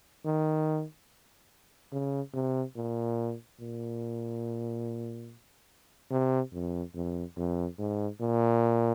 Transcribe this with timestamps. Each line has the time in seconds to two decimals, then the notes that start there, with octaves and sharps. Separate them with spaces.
0.25 D#3
1.92 C#3
2.34 C3
2.76 A#2
3.60 A#2
6.11 C3
6.53 F2
6.95 F2
7.37 F2
7.78 G#2
8.21 A#2